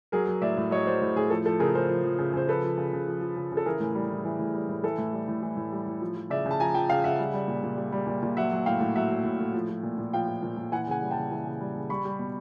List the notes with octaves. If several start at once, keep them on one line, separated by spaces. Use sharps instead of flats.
F#3 G#4 A#4
F#3
A2 D5 E5
A2
F#3 C#5 D#5
F#3 C5 D5
A2
A2 G#4
F3 A4
F3 A4
C#3 G#4 A#4
C#3 A#4 C5
F3
F3
C#3
C#3 C5
F3 A4 B4
F3
C#3
C#3
F3
F3
C#3
C#3
A4
E3 G#4 A#4
A2
G3
A2
E3
A2
G3
A2
E3 A4
A2
G3
A2
E3
A2
G3
A2
F3
F3
C#3 D5 E5
C#3
A5
F3 G#5 A#5
F3 G5 A5
C#3 F5 G5
C#3 E5 F#5
G3
G3
A#2
A#2
G3
G3
A#2
A#2
F#3 E5 F#5
F#3
A2 F5 G5
A2
F#3 E5 F#5
F#3
A2
A2
F3
F3
A#2
A#2
F3 F5 G5
F3
A#2
A#2
E3 F#5 G#5
C#3 F#5 G#5
G3
G5 A5
C#3
E3
C#3
G3
C#3
G3 B5 C#6
G3
B2